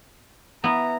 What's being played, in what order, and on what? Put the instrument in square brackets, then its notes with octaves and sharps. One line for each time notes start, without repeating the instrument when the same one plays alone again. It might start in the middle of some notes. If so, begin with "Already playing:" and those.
[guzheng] B3 E4 [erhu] A#5